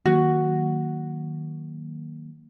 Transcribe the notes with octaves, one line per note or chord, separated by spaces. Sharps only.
D#3 F#3 A#3 F#4